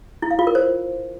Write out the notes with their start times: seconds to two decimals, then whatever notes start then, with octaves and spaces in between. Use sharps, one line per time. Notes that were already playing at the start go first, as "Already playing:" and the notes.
0.22 E4
0.31 F5
0.39 F4
0.47 A#4
0.55 C5